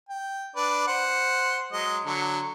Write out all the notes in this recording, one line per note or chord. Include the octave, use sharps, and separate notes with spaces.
G5
D4 B4 D5
C5 F#5
F#3 G#3 D#5
D3 F#3